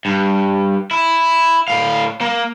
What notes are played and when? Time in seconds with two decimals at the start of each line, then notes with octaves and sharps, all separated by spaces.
0.05 G2
0.91 E4
1.68 A2 F5
2.21 A#3